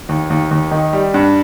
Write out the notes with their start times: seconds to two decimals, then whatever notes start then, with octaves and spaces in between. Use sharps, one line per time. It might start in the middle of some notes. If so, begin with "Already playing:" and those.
0.09 D#2
0.30 D#2
0.51 D#2
0.71 D#3
0.93 G3
1.14 G2